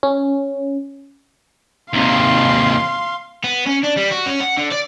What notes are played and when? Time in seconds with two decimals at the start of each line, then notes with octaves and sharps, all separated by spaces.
0.03 C#4
1.93 D#2 C3 F5 C6
3.44 B3
3.66 C#4
3.83 D4
3.97 G3
4.11 F#4
4.26 C#4
4.40 F#5
4.58 D3
4.72 D5